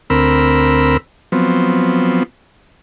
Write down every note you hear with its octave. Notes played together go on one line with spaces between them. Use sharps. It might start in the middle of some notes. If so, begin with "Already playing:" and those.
D2 C4 A#4 B5 E6
F3 F#3 B3 C4